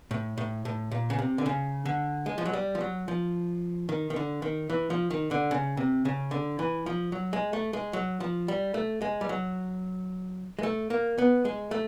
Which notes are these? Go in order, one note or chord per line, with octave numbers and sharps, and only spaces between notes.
A2
A2
A2
A#2
C#3
C3
D3
C#3
D3
G#3
F3
F#3
G3
F3
F#3
F3
D#3
D#3
D3
D#3
E3
F3
D#3
D3
C#3
C3
C#3
D3
E3
F3
F#3
G#3
A3
G#3
F#3
F3
G3
A3
G#3
G3
F#3
G#3
A3
A#3
B3
G#3
A3